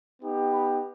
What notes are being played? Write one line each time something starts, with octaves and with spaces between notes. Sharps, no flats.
B3 D#4 G4
B5